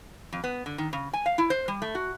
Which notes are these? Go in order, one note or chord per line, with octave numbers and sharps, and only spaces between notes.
F2
B3
D3
D#3
C#3
G#5
F5
E4
C5
G3
A3
F#4